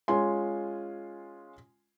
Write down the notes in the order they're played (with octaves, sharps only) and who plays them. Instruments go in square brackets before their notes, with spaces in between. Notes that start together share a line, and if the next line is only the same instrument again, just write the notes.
[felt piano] G#3 C#4 F4 G#5 C6